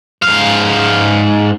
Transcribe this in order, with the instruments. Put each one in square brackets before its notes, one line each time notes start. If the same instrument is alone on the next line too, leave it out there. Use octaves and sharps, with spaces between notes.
[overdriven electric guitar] G#2 F5